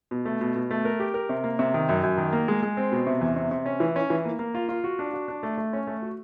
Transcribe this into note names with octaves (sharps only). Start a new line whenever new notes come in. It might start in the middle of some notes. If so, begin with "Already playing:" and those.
B2
A3
B2
B2
A3
A#4
G4
A#4
C3
A#3
C3
D#3
F#2
F#2
D#3
A#3
G#3
G#3
C4
B2
C3
E2
C3
C3
C#4
E3
C#4
E3
A#3
A#3
F4
F4
F#4
D4
F#4
D4
A3
A3
C#4
A3
F#4